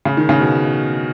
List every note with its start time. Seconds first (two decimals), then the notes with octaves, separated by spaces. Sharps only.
0.05 C#3
0.17 D#3
0.29 C#3
0.41 B2